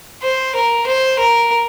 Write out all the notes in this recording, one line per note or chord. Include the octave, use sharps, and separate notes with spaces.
C5
A#4
C5
A#4